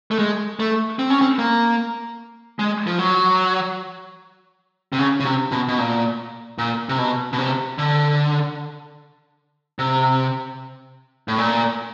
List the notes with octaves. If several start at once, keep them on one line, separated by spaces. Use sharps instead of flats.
A3
G#3
A3
C4
C#4
C4
A#3
G#3
F3
F#3
C3
C#3
C#3
C3
B2
B2
A#2
A#2
C3
B2
B2
C3
D3
C3
A2
A#2